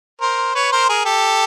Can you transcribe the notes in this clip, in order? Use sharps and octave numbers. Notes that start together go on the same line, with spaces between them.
A#4 C5
B4 C#5
A#4 C5
G#4 A#4
G4 A4